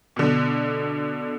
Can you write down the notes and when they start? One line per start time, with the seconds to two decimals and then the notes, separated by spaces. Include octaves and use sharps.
0.16 B2 D3